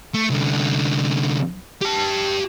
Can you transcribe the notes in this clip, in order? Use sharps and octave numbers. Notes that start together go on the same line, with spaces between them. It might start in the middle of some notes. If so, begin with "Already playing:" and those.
A3
C2 D3
G4 A5